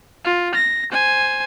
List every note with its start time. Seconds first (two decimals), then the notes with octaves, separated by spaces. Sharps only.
0.24 F4
0.55 A#6
0.91 C5 G#5